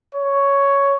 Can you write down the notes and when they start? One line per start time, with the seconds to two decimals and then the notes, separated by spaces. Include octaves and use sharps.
0.15 C#5